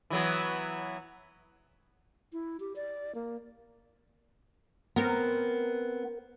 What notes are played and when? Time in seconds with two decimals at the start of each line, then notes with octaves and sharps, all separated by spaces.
0.10 E3 F#3 B3
2.33 E4
2.60 G4
2.76 D5
3.15 A#3
4.96 B3 C4 A#4